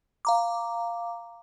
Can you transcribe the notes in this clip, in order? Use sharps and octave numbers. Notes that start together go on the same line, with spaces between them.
F5 A#5 D6